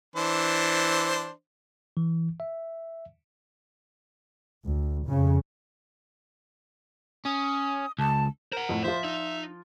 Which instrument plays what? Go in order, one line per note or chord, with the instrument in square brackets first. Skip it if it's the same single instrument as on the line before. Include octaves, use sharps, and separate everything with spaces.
[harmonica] E3 D4 C5
[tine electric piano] E3
E5
[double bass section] D2
F2 C#3
[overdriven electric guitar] C#4 [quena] D#6
[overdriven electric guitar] C#2 [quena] A5
[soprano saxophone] A#4 [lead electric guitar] C5 F#5
[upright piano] F2 A2
[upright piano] F3 F4 [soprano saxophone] C5 [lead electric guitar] E5
[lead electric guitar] D#4 [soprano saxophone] E5